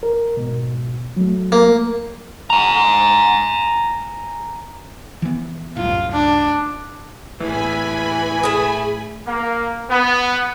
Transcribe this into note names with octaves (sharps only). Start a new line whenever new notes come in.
A#4
G#2 B2
F#3 A3
A#3
G#5 A#5
E3 B3
C2 F#2 A2 F4
D4
A2 E3 G#5 B5
A3 G#4
A#3
B3